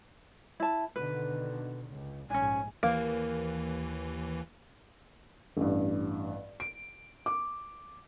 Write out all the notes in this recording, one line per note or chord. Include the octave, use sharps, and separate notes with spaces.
E4 A5
B2 D3 D#3 B4
C#2
A#1 G#2 C#4 D4 G#5
D#2 E3 A#3
A1 G2
D7
D6